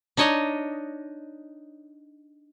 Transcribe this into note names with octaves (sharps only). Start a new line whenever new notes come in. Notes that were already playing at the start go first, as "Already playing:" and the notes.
D4 D#4 C#5 D#5